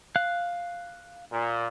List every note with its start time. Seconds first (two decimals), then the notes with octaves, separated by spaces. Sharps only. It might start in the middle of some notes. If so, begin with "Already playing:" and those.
0.16 F5 F#6
1.31 A#2